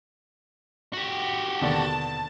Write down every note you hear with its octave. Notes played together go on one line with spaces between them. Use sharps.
F#4 G4
D#2 B2 D3 A5